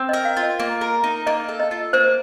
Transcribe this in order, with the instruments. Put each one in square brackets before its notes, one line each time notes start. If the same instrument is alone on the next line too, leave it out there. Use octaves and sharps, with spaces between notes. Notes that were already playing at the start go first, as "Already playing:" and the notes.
Already playing: [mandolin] C4
[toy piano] D#5
[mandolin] A#4
[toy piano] F5
[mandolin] F4
[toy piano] D#5
[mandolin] A#3
A#4
D#4
[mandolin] A#3 [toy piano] D#5
[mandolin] A4
[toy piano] D#5
[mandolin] F4
[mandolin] A#3 [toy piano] C5